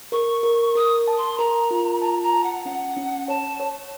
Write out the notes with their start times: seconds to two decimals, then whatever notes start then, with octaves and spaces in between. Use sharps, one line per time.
0.12 A#4 C#6
0.43 A#4
0.75 A#4 D#6
1.08 A5
1.18 C6
1.38 A#4 A#5
1.71 F4
2.02 A5 A#5
2.23 A#5
2.33 A5
2.44 F#5
2.65 C#4 F#5
2.97 C#4
3.28 C#5 A5
3.60 C#5